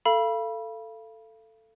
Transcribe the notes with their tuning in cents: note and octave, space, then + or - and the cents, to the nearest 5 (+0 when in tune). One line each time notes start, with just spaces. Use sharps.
A4 +10 F5 -30 B5 -25